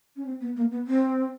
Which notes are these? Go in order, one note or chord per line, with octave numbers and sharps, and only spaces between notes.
C#4
C4
B3
A#3
B3
C4